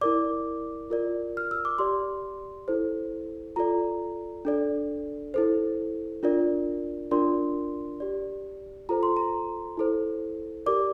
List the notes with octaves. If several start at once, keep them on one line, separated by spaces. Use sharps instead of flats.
E4 A#4 D5 D6
F4 A#4 D5
F6
E6
D6
G4 D5 C6
E4 A4 C5
F4 A4 D5 A#5
D4 A4 D5
E4 A4 C5
D4 F4 A#4 D5
D4 F4 A#4 D5 C6
G4 D5
F4 A4 C5 A#5
C6
A#5
E4 A4 C5
G4 A#4 D5 D6